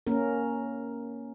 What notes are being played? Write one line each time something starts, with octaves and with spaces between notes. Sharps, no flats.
A#3 C#4 A#4